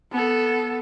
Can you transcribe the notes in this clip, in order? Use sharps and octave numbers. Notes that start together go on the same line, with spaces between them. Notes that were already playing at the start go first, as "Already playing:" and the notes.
B3 A4